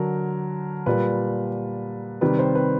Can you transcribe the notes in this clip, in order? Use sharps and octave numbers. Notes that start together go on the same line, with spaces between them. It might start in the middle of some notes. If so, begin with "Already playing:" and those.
Already playing: D3 F#3 A#4
A#2 G3 B4
C3 D#3 G3 B4
C5
B4